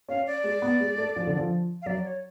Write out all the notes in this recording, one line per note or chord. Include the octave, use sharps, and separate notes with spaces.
C#4 F5
D5
G#3
B3
G#3
A3
F3
D3
F3
F5
F#3 D5
C#5